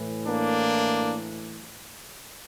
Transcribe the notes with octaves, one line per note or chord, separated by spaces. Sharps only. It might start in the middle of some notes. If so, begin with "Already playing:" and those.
Already playing: A2 E3
A#3 D4